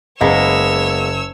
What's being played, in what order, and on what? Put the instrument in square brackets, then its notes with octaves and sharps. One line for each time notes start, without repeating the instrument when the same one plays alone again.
[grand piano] F#1 [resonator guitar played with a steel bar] G#3 A#3 B3 [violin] C#5 E6